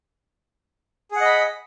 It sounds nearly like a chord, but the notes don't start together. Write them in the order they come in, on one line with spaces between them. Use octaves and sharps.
G#4 F#5 D#5 B5